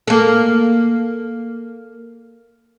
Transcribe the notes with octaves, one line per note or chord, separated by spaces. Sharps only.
A#3 A4